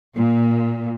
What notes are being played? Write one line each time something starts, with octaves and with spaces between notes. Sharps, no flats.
A#2